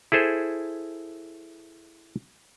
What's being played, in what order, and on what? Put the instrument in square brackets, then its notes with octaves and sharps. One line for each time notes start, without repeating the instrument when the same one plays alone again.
[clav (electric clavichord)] E4 G#4 A4 C5